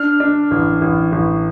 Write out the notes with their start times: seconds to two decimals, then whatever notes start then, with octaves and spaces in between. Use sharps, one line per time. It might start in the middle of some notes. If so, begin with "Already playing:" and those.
Already playing: D4 F6
0.20 D4
0.51 A1
0.81 A1
1.12 A1